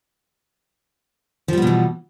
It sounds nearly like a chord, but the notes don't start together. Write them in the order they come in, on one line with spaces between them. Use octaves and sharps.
F3 G3 B3 B2 E3